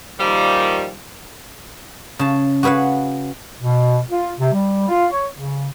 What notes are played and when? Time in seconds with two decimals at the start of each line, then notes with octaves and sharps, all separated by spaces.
0.20 A#2 D#3 F3 G3
2.19 C#3 A5
2.63 F#4 G#4 B4 F5 F#5
3.60 B2
4.10 F4
4.39 C3
4.53 G3
4.89 F4
5.11 C#5
5.35 C#3